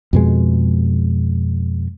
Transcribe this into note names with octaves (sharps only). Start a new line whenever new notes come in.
F2 B2 G#3